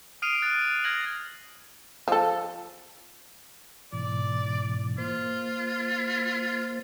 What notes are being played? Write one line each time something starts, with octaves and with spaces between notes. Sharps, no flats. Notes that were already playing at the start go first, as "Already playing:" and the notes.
D#6 F6 C7 D7 D#7 F7
F#6 A6 D7
F6 G#6 A#6 F#7
F3 A4
G#2 B2 E3 D5
A#3 F4 C5